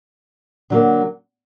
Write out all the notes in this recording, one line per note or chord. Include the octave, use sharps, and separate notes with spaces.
D3 F#3 A#3